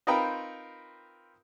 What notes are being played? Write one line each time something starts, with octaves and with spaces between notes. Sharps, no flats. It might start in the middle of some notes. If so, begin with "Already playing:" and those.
C4 D#4 F4 A#4 B4 G5